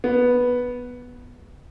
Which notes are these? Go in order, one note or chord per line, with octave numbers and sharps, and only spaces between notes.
B3